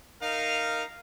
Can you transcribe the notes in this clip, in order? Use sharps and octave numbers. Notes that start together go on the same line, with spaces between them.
D#4 A#4 F5